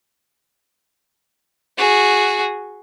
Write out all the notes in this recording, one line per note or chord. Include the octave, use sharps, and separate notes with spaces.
F#4 G#4